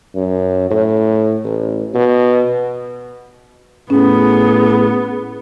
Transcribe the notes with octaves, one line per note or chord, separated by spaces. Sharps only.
F#2
A2
A1
B2
A2 B3 C#4 G#4